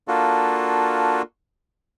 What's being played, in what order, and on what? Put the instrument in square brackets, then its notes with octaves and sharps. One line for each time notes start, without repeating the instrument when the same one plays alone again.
[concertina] A#3 D4 F4 F#4 A4